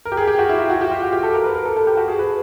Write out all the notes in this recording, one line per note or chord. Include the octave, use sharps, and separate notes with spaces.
A#4
G4
G#4
G4
F#4
E4
F4
F#4
G4
F4
F#4
G4
A4
A#4
B4
A#4
A4
A4
G4
F#4
G#4
B4